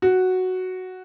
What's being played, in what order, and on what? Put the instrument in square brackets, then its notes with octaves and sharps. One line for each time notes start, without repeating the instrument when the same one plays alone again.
[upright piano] F#4